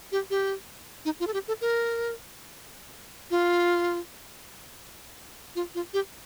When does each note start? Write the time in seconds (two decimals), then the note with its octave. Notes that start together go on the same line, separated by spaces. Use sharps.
0.12 G4
0.30 G4
1.05 D#4
1.20 F4
1.27 A4
1.34 G4
1.48 A4
1.61 A#4
3.31 F4
5.56 F4
5.75 F4
5.94 G4